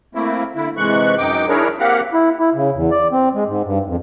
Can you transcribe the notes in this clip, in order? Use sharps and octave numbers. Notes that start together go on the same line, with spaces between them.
A3 A#3 C4 E4
D3 E4
G#2 C3 E3 G#3 C#6 F#6
F#2 D#4 G5 D6
D4 E4 G#4 A#4 C#5
A#3 C4 G4 F5 F#5
E4
E4
C#3
E2
D5
C4
G#3
G#2
G2
F2